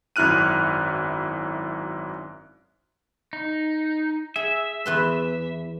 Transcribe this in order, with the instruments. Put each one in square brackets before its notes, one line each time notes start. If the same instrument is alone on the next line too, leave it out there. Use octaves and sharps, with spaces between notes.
[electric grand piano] G#1 F#2 E4 F6 F#6 D#7
[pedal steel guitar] D#4
[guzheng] G#4 [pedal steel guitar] E5
[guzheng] E2 B4 C6